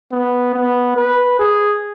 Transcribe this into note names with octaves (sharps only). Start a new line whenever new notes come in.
B3
B3
B4
G#4